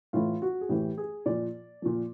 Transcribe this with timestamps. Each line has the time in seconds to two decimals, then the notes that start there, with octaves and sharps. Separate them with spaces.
0.13 A2 E3 F4
0.42 F#4
0.61 G#4
0.69 A2 E3 G4
0.98 G#4
1.26 A#2 F3 D5
1.82 A#2 F3